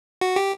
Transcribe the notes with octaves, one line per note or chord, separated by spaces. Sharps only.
F#4
G4